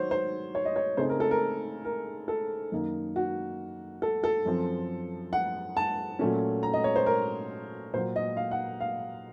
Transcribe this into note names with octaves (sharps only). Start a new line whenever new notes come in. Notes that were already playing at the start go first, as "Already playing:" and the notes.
Already playing: D#3 F#3 C5 C#5
C5
C#5
D#5
C#5
C#3 A3 C4 D#4 C5
A#4
A4
A#4
A#4
A4
F#2 D#3 A#3 D#4
F#4
A4
A4
F#2 F3 C4
F#5
A5
A#2 F#3 A3 C#4
A#5
D#5
C#5
C5
A#4
A#2 F#3 A#3 C5
D#5
F5
F#5
F5